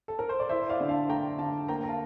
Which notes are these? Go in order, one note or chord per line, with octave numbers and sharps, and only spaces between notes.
A4
A#4
C5
D5
E4 C5 E5
D5 F5
D3
F5 A5
A3 G5 A#5
D3 F5 A5
A#3 G5 A#5
A#5
F5 A5